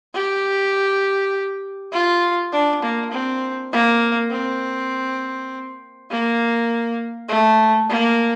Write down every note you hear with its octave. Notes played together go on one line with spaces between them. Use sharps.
G4
F4
D4
A#3
C4
A#3
C4
A#3
A3
A#3